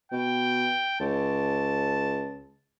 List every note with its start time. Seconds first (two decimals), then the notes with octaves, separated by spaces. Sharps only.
0.11 B2 G5
1.00 C#2 A5